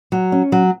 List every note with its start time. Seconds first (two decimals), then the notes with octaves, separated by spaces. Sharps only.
0.12 F#3
0.32 C#4
0.52 F#3